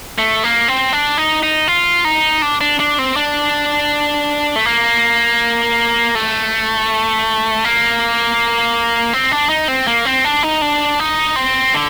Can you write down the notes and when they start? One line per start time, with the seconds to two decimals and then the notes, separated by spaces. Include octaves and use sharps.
0.18 A3
0.44 A#3
0.68 C4
0.92 D4
1.18 D#4
1.43 D#4
1.68 F4
2.05 D#4
2.42 D4
2.61 D4
2.80 D4
2.99 C4
3.16 D4
4.56 A3
4.66 A#3
6.15 A3
7.64 A#3
9.13 C4
9.32 D4
9.49 D#4
9.68 C4
9.87 A#3
10.05 C4
10.25 D4
10.43 D#4
10.61 D4
11.00 D#4
11.36 C4
11.74 D3